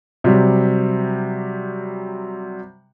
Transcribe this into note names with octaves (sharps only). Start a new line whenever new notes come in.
C3 F#3 G3